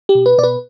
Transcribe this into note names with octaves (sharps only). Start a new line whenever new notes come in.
G4
B2
B4
B2 D5
B4